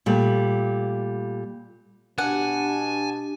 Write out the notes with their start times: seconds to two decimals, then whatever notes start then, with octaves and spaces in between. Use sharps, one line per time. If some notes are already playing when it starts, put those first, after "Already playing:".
0.06 A#2 G3 A3
2.18 B2 D4 G4 F#5 G#5 A5